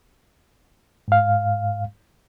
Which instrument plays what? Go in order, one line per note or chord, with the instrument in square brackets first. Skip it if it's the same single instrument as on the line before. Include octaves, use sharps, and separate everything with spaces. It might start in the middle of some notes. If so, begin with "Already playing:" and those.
[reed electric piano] G#2 F5